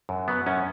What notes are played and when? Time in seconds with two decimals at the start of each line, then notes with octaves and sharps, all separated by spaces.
0.09 F#2
0.28 F#3 B3
0.46 F#2 C#4